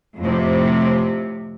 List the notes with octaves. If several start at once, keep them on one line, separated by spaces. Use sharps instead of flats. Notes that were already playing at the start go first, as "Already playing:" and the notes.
F2 A2 C3